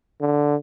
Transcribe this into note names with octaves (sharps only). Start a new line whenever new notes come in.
D3